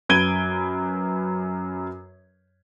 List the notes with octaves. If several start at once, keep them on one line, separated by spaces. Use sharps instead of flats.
F#2 B4 G#6 D7 D#7 G7